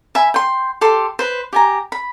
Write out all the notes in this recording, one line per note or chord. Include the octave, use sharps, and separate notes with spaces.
E5 G#5 B5
G5 C6
G4 A4 C6
B4 C5
G4 G#5 A#5
B5